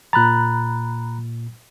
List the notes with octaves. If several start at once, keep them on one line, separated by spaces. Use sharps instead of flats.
A#2 A#5 B5 F#6 A6